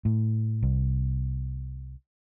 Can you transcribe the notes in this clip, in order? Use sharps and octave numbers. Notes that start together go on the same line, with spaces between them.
A2
C2